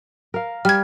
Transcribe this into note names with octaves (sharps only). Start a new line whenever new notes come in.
A#4 F5
G3 F6 G#6